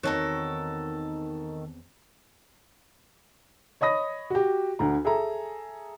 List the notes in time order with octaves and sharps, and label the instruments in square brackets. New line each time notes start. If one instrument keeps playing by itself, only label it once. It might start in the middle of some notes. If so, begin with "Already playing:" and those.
[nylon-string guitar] E2 C4 C#5 [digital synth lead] D#3 [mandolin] F#4 A4 A#4
[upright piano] C#5 D#5 B5 D#6 A#6
F#4 G4
D2 D3 A#5
G#4 A4 E5 A#5